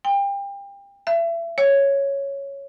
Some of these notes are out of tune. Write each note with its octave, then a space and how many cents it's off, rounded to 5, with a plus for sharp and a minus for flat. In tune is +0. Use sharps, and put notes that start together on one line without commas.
G5 +30
E5 +30
C#5 +0